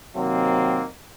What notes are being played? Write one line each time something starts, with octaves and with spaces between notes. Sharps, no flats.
C3 D#3 F#3 A#3 C4